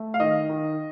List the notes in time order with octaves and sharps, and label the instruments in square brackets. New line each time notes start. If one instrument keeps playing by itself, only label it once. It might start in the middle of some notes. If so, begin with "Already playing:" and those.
Already playing: [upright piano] A3
F5
D#3 D#5
D#3